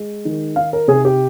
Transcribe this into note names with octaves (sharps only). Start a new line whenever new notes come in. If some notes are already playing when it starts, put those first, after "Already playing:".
Already playing: G#3
D#3
D#4 F5
A#4
C3 G#4
G4